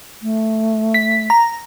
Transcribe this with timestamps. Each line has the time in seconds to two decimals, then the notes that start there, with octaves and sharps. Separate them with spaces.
0.22 A3
0.94 B6
1.30 A#5